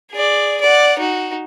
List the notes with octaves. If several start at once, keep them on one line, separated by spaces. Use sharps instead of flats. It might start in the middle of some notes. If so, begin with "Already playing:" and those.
G#4 D5
D5 F#5
D#4 F#4